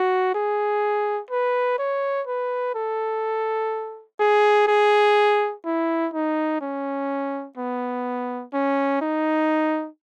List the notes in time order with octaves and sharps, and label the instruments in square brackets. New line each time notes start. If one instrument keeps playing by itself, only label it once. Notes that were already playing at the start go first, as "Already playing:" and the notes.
Already playing: [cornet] F#4
G#4
B4
C#5
B4
A4
G#4
G#4
E4
D#4
C#4
B3
C#4
D#4